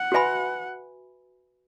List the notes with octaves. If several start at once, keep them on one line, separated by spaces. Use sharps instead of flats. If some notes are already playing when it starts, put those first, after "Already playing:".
Already playing: F#5
F#4 B4 E5 G#5 B5